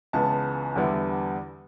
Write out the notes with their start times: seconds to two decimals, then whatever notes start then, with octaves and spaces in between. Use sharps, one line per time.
0.13 C#2 C#3 E3 B3 A5
0.76 E2 D3 G3 B3 E4